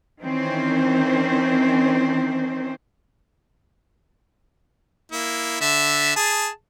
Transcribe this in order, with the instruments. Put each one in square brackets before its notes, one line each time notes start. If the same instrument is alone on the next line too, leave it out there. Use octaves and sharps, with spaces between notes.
[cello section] D#3 E3 C4 C#4 C5
[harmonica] A#3 E4
D3 E5
G#4 A5